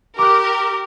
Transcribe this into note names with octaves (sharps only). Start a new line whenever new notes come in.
G4 A#4 D6 F6 F#6